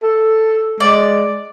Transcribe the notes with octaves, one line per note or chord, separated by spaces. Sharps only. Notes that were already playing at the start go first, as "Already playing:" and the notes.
A4
G#3 D5